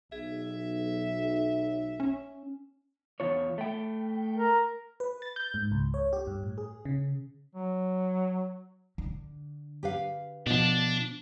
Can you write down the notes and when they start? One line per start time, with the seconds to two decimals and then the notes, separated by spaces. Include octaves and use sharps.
0.12 B1 G#4 E5
2.00 C#4
3.20 E2 F4 C#5
3.58 A3 G5
4.38 A#4
5.00 B4
5.22 A6
5.36 G6
5.54 G#2
5.72 C#2
5.94 C#5
6.13 G4
6.27 G2
6.43 A2
6.58 G#4
6.85 C#3
7.55 F#3
8.98 D3
9.83 G4 B4 F5
10.47 B2 F3 D4